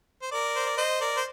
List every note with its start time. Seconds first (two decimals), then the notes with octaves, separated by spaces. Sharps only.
0.22 C5
0.31 A#4 D5
0.56 C5
0.66 D5
0.77 C5 D#5
1.01 A#4 D5
1.17 C5